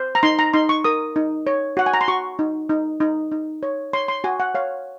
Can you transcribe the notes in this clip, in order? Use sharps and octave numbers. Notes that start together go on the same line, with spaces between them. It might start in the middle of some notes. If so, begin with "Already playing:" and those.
Already playing: C5
A#5
D#4 C6
A#5
D#4 C6
C#6
A#4 D#6
D#4
C#5
F#4 F#5
G#5
A#5
C6
F#4 C#6
D#4
D#4
D#4
D#4
C#5
C#5 C6
C6
F#4 G#5
F#5
C#5 F5